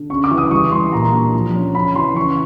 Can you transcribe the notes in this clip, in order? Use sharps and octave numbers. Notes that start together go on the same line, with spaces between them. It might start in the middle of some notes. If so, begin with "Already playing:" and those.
Already playing: D3
C#3 C#6
D6
E3
D#6
G3 C#6
G3 C6
A#2 A#5
D4
F3
C#4
C#3 B5
E3 C6
C#3 C#6